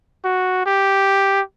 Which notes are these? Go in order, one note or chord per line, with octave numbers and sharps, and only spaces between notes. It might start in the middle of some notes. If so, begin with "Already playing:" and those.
F#4
G4